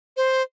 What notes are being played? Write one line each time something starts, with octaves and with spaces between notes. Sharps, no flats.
C5